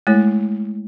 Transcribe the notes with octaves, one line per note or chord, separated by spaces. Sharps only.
G#3 A3 E4 C#5